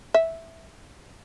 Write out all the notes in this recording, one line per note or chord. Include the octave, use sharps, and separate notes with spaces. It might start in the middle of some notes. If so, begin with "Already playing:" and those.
E5